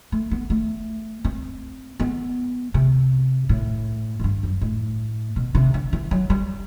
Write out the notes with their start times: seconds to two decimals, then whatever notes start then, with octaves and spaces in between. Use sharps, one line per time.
0.12 A3
0.31 B3
0.50 A3
1.24 C4
1.99 B3
2.74 C3
3.49 A2
4.19 A2
4.24 G2
4.43 F#2
4.61 A2
5.36 B2
5.55 C3
5.74 D3
5.93 E3
6.11 F#3
6.30 G3